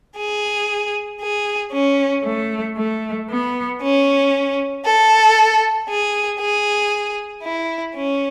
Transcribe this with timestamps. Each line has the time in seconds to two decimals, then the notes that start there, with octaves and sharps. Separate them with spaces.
0.17 G#4
1.21 G#4
1.72 C#4
2.25 A3
2.76 A3
3.29 B3
3.81 C#4
4.84 A4
5.88 G#4
6.40 G#4
7.43 E4
7.95 C#4